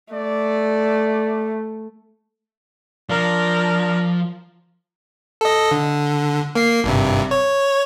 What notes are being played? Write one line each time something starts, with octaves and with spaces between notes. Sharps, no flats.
A3 D5
F3 D4 A#4
A4 D#5
D3
A#3 C7
G#1 G2 C3
C#5